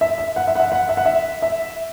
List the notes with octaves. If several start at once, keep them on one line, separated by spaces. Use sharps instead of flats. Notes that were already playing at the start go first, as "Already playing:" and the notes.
E5
E5
F#5
E5
F#5
E5
F#5
E5
F#5
E5
E5